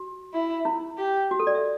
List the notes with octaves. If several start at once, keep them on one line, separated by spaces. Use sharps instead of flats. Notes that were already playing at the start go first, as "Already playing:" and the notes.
Already playing: F#4
E4
E4
G4
F#4
A4
D5
E5